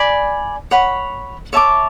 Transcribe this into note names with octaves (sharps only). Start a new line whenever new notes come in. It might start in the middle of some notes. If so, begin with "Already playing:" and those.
Already playing: D5 G#5 B5
C#5 F#5 B5
C#5 E5 A5 D6